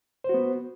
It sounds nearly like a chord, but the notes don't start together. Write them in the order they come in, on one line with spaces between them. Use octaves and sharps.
C5 F#4 B3